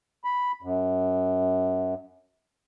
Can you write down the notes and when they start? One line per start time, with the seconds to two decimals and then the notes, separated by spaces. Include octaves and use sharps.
0.24 B5
0.62 F#2